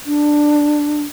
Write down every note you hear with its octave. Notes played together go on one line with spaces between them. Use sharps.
D4